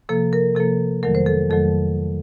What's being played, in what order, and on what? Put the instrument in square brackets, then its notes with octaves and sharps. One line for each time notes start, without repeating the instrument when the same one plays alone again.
[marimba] C3 F3 A#3 A4
A#4
C3 F3 A#3 A4
F2 D#3 F#3 A3 A#4
C5
A4
F2 D#3 F#3 A3 A4